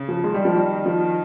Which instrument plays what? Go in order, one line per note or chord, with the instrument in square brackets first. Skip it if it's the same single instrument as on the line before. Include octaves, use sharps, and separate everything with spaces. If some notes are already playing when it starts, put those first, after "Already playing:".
Already playing: [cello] C#3
[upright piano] F3
[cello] D#3 [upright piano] G#3
[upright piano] G3
F3
G3
F3